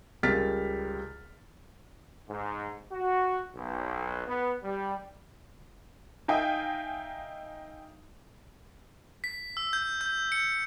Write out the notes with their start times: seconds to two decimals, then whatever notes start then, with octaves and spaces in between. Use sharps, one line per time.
0.23 C#2 G3 A#4 F6 A6 B6
2.28 G#2
2.92 F#4
3.56 B1
4.28 B3
4.63 G3
6.28 D#4 E5 F5 G5 G#5 D#6
9.24 B6
9.57 E6
9.73 G6
10.01 G6
10.32 C#7